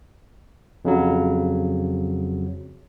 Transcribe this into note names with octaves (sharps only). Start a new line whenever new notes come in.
F2 C#3 F#3